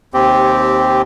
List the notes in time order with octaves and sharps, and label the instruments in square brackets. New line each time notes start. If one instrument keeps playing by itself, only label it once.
[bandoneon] D#2 C4 G4